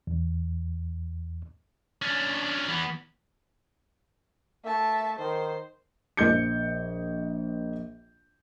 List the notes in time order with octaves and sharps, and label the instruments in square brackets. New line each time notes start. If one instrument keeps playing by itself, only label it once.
[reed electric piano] E2
[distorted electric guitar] C#4 D4
E3 B3
[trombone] A3 [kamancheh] E5 A5
[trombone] D#3 [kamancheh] C5
[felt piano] A#1 D#5 G6 C#7